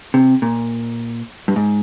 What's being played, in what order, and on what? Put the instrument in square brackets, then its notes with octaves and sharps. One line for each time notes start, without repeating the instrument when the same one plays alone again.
[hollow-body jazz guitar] C3
A#2
G2
G#2